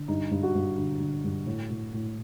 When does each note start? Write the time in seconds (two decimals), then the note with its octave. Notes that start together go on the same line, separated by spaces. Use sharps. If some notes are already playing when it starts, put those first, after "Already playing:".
Already playing: D3
0.08 G2 D#4
0.31 G2
0.43 F#4
0.55 G2
0.78 D3
1.00 D3
1.24 G2
1.46 A2
1.70 A2
1.93 A2